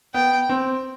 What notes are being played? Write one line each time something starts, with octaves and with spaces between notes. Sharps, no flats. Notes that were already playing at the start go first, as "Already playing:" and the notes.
B3 G5
C4